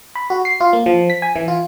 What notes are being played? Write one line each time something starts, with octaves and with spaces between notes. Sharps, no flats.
B5
F#4
C7
F4
A#3
F3
B6
G#5
E3
F4